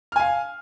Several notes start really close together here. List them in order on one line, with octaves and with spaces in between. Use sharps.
F6 G#5 F5